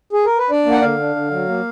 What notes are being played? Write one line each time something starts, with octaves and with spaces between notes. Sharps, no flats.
G#4
A#4
B4
D4 D5
A#3
F#5
D3 F5
D4
D3
F#3
A#3